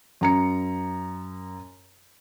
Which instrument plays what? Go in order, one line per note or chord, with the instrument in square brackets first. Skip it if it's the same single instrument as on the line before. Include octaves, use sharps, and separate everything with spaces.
[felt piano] F#2 A#5 C#7